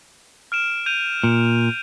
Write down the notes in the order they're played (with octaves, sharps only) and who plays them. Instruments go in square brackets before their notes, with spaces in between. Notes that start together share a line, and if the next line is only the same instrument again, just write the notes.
[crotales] F6 D7 E7
G6 D#7 F7
[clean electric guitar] A#2